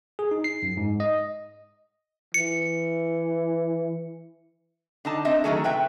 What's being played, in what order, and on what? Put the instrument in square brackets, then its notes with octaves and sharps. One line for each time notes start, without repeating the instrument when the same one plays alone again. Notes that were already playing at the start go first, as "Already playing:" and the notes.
[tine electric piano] G#4
D#4
C7
F#2
G#2
D#5
[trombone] E3 [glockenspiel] C#7
[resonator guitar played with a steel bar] D3 D#4 A5
C4 D4 D#5 E5
D#3 E3 F#3 A3 G#4 A4
C3 B4 E5 G5